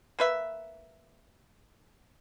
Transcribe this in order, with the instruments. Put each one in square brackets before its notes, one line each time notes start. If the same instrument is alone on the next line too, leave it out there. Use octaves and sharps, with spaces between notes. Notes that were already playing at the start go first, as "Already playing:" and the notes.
[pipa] A#3 B4 E5